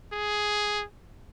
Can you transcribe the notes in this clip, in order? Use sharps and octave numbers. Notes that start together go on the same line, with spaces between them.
G#4